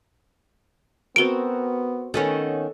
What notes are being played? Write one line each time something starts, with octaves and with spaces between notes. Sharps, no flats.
B3 C4 F#4 A#4 D7 G7
D#3 B3 C#4 A4 D#5 F#5